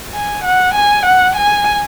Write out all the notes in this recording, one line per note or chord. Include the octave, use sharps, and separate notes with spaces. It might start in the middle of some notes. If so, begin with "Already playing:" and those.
G#5
F#5
G#5
F#5
G#5